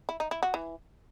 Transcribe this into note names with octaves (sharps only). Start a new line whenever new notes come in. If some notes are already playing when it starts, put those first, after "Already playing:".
E4
D#4
E4
F#4
E3